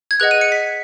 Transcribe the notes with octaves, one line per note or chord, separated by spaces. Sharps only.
G#6
G#4 B4 D#5 F#5 F#6
D#7
C#7
B6